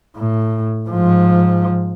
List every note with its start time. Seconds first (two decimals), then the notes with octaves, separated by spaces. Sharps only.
0.17 A2
0.89 G#2 F3